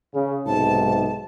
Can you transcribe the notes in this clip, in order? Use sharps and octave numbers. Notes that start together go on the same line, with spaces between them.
C#3
B1 G#2 C3 A5